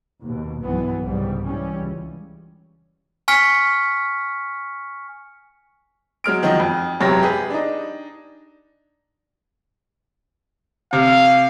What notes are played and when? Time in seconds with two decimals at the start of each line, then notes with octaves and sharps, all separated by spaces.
0.22 D#2 B2
0.63 B1 G2 E3 B3
1.02 C2 G#2 C#3 G3
1.46 E3 G3 C#4
1.80 C#2
3.28 G#5 C#6 F6 B6 C#7
6.24 F#3 G#3 F6 D7
6.43 D#3 F3 F#3 D#4
6.60 F2
7.00 E1 F#2 C3 C#5 A#6
7.22 G4 G#4 B4
7.50 D4 D#4
10.93 C3 F5